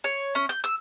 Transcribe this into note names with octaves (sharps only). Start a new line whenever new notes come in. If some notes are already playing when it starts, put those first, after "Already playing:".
C#5
C#4
G6
E6